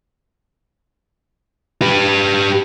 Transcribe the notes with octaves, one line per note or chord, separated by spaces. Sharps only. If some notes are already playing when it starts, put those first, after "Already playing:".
G4 B4